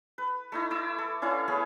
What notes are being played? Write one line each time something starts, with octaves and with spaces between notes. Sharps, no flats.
B4
A3 D#4 E4
E4 D6 E6
A4
C#4 D4 E4 F5
A3 B3 C#4 G#4